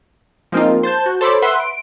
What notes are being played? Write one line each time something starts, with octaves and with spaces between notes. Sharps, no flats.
F3 G#3 A#3 C4 D#4 F4
C5 A5 G6
F#4
A4 C5 C#5 B5 D6
B4 E5 F#5 C6
D7